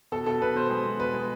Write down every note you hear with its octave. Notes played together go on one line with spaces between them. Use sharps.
B2 A4
B2 A4
B2 B4
B2 C5
G#3 C5
B2
B2 B4
G#3